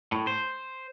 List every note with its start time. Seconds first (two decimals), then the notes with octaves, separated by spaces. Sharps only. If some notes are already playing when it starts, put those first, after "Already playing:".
0.12 A2
0.27 C5